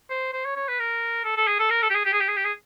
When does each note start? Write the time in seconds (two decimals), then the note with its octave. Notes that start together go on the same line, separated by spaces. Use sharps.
0.10 C5
0.33 C5
0.45 C#5
0.56 C#5
0.68 B4
0.80 A#4
1.24 A4
1.37 A4
1.47 G#4
1.59 A4
1.71 A#4
1.82 A4
1.90 G4
1.94 G#4
2.05 G4
2.13 G#4
2.20 G4
2.28 G#4
2.36 G4
2.44 G#4